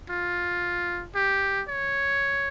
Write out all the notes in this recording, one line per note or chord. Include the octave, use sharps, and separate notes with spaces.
F4
G4
C#5